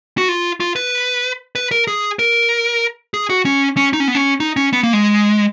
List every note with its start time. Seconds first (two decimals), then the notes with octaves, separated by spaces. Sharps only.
0.18 F#4
0.29 F4
0.60 F4
0.76 B4
1.55 B4
1.71 A#4
1.88 G#4
2.19 A#4
3.14 G#4
3.30 F#4
3.45 C#4
3.77 C#4
3.93 D#4
4.00 C#4
4.08 B3
4.15 C#4
4.40 D#4
4.57 C#4
4.73 B3
4.83 A#3
4.93 G#3